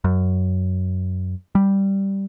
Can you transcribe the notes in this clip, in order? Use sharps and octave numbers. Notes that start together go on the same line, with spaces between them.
F#2
G3